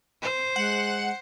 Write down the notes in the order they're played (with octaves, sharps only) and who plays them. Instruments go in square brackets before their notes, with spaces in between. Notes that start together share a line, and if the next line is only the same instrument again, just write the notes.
[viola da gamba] C5
[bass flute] G#3 [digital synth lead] F#5